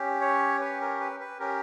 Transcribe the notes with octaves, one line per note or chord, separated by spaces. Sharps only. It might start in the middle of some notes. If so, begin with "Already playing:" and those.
Already playing: C#4 G4
C#5
B4
A#4
B4
B4
C#4 G4 A#4